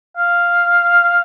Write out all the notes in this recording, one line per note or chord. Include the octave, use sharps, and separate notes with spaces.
F5